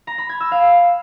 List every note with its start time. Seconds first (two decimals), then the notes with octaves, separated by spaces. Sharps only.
0.07 A#5
0.18 B5
0.29 G#6
0.40 E6
0.52 F5